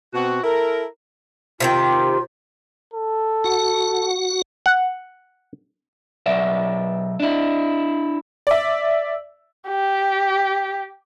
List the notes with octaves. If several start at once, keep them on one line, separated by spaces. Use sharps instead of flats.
B2 C4 F#4
E4 A4 A#4
C3 D#3 F4 G4
A4
F#4 F#5
F#5
B1 D5 E5
D4 E4
D5 E5
G4